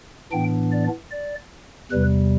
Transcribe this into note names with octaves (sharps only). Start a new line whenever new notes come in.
A2 E3 B3 D4 G5
D5
D5
E2 C3 G3 B4